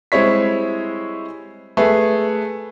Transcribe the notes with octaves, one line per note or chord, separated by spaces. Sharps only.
G3 G#3 C4 E4 C#5 B6
A3 G#4 B4